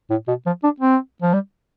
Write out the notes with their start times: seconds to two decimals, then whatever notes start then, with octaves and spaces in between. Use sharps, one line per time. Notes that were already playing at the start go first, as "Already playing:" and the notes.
0.10 A2
0.28 B2
0.46 F3
0.64 D4
0.80 C4
1.22 F3
1.34 G3